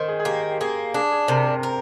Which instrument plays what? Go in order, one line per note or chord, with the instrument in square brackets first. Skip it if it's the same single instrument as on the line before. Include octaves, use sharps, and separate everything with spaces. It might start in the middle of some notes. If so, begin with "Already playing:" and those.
Already playing: [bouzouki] D#3 [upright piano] C5
[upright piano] G#4
G#4
[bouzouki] A#3 [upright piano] G4
[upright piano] G4
[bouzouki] A#3 [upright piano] G#4
[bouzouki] D4 [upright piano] G#4
[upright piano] G#4
[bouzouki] C3 [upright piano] A#4
[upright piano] A#4
[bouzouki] A#4